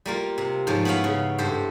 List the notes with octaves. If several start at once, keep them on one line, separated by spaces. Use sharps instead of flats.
G3 A#3 F4
C3
G#2 F3 C#4
B3 C#4 E4 C#5 F5 B5
C#3
G2 G4 A4 C5